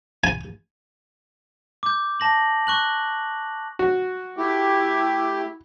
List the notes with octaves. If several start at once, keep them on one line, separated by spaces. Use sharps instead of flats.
G#5
D6 G6
A5 A#6 F#7
C#6 F#6 F#7
F#4
A3 E4 G4